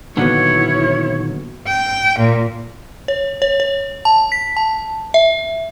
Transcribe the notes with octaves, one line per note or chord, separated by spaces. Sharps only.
A#2 D3 D#3 F#3 B3 E4 C#5
G5
A#2
C#5
C#5
C#5
A5
B6
A5
E5